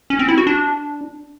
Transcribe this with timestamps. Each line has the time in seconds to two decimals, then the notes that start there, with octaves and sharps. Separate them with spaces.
0.10 C#4
0.19 C4
0.28 E4
0.38 F#4
0.47 D4